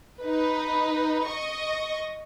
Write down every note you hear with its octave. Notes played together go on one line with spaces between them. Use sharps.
D#4 B4
D#5 C#6